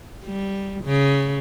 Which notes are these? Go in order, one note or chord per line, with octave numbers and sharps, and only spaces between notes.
G3
C#3